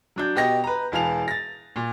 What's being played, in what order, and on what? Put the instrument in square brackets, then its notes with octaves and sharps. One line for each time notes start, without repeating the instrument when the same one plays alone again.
[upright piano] F#3 D4 G6
B2 G4 D#5 A#6
B4 A#5
E1 E3 F5 A5 F7
A6 A#6
A#2